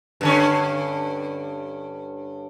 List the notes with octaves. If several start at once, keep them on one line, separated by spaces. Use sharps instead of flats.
G2 D3 C#4